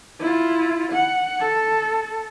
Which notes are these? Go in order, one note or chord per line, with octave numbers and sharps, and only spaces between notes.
E4 F4
F#5
A4